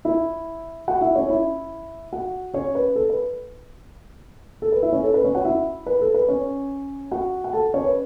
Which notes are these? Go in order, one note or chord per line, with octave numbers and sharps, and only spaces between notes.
E4 E5
F#4 F#5
E4 E5
C#4 C#5
E4 E5
F#4 F#5
C#4 C#5
B4
A4
B4
A4
B4
E4 E5
C#4 C#5
A4
B4
C#4 C#5
F#4 F#5
E4 E5
B4
A4
B4
C#4 C#5
F#4 F#5
F#5
A4 A5
C#4 C#5
B4